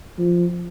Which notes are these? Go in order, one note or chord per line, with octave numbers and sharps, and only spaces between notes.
F3